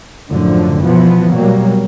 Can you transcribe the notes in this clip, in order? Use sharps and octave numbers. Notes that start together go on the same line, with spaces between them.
F#2 A2 D3 F3
B2 E3 F3 B3
B2 F#3 G3 A#3